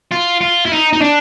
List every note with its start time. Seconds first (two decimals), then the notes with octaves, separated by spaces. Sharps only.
0.12 F4
0.41 F4
0.66 E4
0.72 D#4
0.93 D#4
1.01 D4